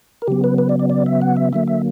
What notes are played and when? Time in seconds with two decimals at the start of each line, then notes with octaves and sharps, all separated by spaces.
0.22 A#4
0.27 C#3 F#3 B3 G4
0.44 B4
0.58 B4
0.69 D5
0.80 D5
0.90 D5
1.06 E5
1.22 F#5
1.36 E5
1.53 D3 F#3 A#3 E5
1.68 E5